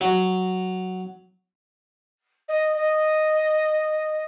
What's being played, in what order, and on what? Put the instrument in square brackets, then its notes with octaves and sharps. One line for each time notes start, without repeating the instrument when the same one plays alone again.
[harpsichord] F#3
[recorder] D#5
D#5